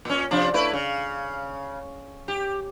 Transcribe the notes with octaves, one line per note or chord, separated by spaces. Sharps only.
A#2 C#4
C3 F3 D4
A3 E4 B4
C#3
G4